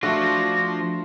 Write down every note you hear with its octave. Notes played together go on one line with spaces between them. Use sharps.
F3 A3 D4 F4 F#4 A#6